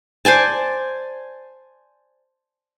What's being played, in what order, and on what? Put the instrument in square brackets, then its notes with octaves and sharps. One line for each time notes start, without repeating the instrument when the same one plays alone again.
[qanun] C5 D5 G#5 A5